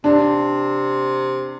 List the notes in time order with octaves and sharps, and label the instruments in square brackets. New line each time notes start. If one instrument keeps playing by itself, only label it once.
[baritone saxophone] C3 [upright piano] D4